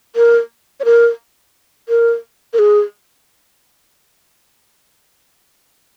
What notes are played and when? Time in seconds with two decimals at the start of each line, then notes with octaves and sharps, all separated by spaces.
0.16 A#4
0.80 C#5
0.85 A#4
1.89 A#4
2.53 A#4
2.59 G#4